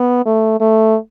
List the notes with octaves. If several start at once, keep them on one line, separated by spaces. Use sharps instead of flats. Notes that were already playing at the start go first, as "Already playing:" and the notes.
Already playing: B3
A3
A3